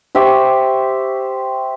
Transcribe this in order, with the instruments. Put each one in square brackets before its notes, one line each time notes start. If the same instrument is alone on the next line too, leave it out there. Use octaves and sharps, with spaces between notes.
[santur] G4 C5 E5 C#6